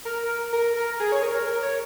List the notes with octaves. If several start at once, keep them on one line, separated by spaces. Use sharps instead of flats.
A#4
A#4
A#4
G#4
C#5
A#4
A#4
C#5